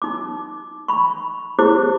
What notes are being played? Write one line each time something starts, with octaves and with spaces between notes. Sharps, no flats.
D#4 D6
B5 C#6
E4 G4 G#4 C5 D6